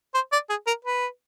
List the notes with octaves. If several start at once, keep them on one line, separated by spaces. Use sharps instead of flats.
C5
D5
G#4
A#4
B4